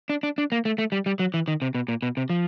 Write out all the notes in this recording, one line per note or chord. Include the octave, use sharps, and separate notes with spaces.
D4
D4
D4
A#3
A3
A3
G3
G3
F#3
E3
D#3
C3
B2
A#2
B2
C3
F3